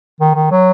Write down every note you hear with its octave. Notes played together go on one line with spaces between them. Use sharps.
D#3
D#3
F#3